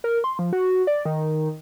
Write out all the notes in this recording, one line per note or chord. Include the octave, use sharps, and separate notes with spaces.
A#4
C6
F3
F#4
D5
D#3